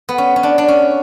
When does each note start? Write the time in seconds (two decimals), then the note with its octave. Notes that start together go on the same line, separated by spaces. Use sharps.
0.09 B3
0.18 C#4
0.36 C#4
0.43 D4
0.58 D4
0.68 C#4